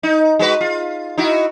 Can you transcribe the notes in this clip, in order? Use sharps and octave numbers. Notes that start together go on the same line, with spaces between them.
D#4
G#3 F#4 B4
F4
D#4 E4 F#4